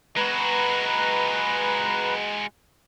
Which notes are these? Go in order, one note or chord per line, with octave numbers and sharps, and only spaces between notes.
G#3 F#4 B4 A#5